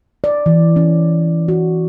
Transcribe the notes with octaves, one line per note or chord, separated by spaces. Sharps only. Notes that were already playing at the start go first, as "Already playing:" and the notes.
D5
E3
C#4
F#4